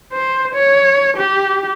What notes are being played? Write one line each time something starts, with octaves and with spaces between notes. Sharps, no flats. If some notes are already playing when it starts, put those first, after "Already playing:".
C5
C#5
G4